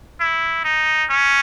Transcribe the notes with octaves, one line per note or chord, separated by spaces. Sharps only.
E4
D#4
C#4